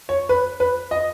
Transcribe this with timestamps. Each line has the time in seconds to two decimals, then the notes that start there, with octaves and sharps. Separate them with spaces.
0.09 C#5
0.29 B4
0.60 B4
0.91 D#5